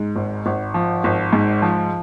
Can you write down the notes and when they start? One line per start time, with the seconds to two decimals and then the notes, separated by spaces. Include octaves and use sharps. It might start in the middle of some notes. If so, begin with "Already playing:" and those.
Already playing: G#2
0.16 G#1
0.46 G#1
0.74 F3
1.04 G#1
1.33 G#2
1.62 F3